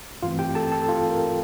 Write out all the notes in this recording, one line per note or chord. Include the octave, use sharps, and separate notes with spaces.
G2 E3 A3 C4 F4 F5
G4 G5
A4 A5
A4 A5
F4 F5
A#4